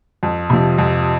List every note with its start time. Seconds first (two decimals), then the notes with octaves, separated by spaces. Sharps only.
0.23 F2
0.50 C3 F3
0.78 F2